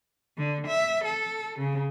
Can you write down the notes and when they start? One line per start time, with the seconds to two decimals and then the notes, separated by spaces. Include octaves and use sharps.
0.37 D3
0.67 E5
1.04 A4
1.59 C#3